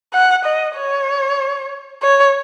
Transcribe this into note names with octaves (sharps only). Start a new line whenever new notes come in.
F#5
D#5
C#5
C#5